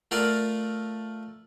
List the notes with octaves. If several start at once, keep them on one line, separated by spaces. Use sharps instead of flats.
A3 F4 A#4 D5 F5